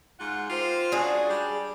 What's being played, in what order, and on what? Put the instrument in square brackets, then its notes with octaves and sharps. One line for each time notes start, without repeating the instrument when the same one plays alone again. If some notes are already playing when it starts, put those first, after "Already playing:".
[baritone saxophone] G#2 [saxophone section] F4 F#5
[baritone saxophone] F4 [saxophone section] G4 A#4 C5
[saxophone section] G#3 C#4 F#4 [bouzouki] D4 G#4
[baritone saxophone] G3